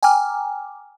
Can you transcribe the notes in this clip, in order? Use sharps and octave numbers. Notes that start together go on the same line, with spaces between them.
G5 G#5 A#5 D6 F6